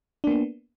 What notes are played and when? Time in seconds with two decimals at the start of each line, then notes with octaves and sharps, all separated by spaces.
0.24 D4
0.27 A#3
0.30 B3